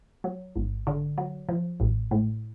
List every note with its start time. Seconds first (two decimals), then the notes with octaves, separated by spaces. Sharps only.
0.24 F#3
0.56 G#1
0.87 D3
1.18 F#3
1.49 F3
1.80 A1
2.11 A2